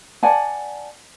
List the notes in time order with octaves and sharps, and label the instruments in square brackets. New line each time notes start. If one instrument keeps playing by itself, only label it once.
[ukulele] D5 F#5 G#5 A5